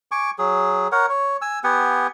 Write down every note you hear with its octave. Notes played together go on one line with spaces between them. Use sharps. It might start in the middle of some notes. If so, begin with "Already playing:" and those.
G#5 C#6 D6
F#3 G#4
A#4 C#5 F#5
C#5
G#5 E6
B3 G4 F#5 G#5